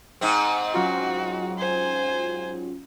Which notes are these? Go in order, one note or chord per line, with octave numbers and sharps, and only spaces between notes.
G#2 C4 C#7
F#3 C#4 F4 F#4
C5 G#5